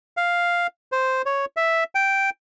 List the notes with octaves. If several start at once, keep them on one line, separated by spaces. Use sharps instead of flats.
F5
C5
C#5
E5
G5